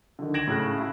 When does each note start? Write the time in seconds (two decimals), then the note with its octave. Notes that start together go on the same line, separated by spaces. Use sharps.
0.19 D3 D#3
0.34 G#6 A#6 D7 E7 F#7
0.47 A2 C#3 F#6
0.78 E4